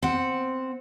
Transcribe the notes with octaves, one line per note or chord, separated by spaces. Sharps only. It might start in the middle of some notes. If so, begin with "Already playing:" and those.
C4 F#5